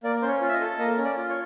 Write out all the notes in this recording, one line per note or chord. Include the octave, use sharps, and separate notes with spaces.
A#3 D5
C#4 C5
C#5
F4
E5
D#5
A4
A#3 D#5
C#4
D5
F4
C#5